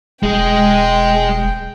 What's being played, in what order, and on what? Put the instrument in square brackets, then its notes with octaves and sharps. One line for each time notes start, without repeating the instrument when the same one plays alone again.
[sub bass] E1 [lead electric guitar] G#3 G#4 [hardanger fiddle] G5